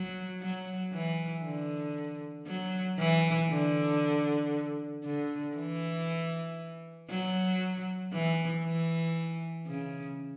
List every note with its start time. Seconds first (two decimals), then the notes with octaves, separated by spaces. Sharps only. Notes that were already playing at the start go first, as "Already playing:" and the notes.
Already playing: F#3
0.41 F#3
0.92 E3
1.44 D3
2.47 F#3
2.98 E3
3.49 D3
5.04 D3
5.55 E3
7.10 F#3
8.13 E3
8.64 E3
9.67 C#3